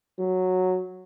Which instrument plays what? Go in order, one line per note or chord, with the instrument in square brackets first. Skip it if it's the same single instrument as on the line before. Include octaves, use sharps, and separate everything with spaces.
[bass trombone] F#3